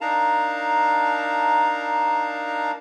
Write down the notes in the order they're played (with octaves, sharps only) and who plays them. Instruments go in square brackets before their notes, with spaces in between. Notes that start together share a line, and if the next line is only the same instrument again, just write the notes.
[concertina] D4 D#4 A#4 F5 A5 A#5